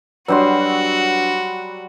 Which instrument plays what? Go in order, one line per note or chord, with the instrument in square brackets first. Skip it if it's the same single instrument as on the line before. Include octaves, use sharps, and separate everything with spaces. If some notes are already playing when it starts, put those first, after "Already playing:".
[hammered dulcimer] F#3 G3 C6 [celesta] D4 B4 [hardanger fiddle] F#4